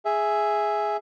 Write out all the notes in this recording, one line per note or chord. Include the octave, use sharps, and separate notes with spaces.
G#4 E5